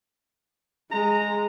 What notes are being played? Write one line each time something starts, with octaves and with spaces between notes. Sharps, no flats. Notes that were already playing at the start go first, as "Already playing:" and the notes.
G#3 A#5